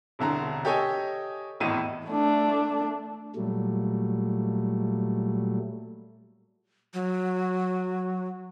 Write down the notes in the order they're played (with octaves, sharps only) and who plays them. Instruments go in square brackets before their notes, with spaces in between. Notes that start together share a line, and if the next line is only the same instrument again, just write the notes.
[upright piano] E1 C2 D3 A#5
G4 A4 C#5 D#5 G#5
G#1 E2 A2 D#5 D#7
[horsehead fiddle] A3 D4
[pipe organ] A#2 F#3 G3 A3
[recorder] F#3